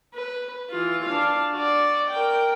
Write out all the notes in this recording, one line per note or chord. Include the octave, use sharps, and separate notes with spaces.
B4
E3 F4
D4 F5
F#4 D5
A#4 G5